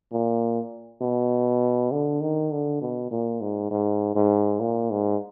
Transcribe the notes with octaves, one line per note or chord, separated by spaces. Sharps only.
A#2
B2
D3
D#3
D3
B2
A#2
G#2
G#2
G#2
A#2
G#2